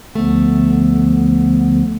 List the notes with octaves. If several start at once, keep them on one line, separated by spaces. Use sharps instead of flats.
D2 D3 F3 A3 B3